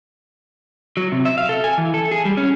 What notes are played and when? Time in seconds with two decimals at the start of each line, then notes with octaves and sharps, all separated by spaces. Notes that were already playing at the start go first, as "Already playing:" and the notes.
0.97 F#3
1.12 C3
1.25 E5
1.38 F5
1.49 A4
1.64 G#5
1.78 E3
1.94 A4
2.11 G#4
2.25 G3
2.37 C#4